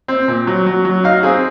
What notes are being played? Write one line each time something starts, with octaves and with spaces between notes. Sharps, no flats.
C4
A#2
F#3
F#3
F#3
D#4 F5
C4 G#4